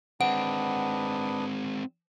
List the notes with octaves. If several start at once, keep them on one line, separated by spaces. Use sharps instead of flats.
G#3 C4 D4 B4 F#5 D#6